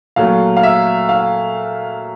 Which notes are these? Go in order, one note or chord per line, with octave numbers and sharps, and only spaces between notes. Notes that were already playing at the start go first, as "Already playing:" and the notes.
A#2 F#3 A3 F5
F5
E5
F5